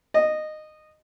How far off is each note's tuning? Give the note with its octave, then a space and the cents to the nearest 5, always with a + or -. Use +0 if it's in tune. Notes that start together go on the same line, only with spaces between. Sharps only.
D#5 -15